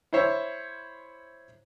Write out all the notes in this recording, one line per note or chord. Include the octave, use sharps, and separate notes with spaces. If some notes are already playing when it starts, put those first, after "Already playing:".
E4 C5 C#5 E5